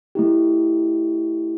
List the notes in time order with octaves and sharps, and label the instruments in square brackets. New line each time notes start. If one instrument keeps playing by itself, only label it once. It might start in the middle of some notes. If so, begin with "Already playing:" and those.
[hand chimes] A3 E4 G4